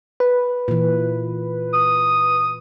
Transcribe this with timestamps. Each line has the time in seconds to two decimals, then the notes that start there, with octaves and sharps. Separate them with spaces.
0.20 B4
0.68 A#2 E3
1.74 D#6